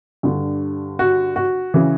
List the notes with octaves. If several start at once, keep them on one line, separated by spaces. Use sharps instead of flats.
G2 D3
F#4
F#4
C#3 E3